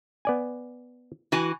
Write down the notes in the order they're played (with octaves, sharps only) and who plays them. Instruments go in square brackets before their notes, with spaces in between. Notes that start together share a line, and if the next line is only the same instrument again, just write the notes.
[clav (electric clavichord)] B3 D5 G#5
[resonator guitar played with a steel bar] E3 F#4 G#5